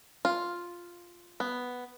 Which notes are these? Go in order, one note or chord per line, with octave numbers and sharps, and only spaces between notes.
F4
B3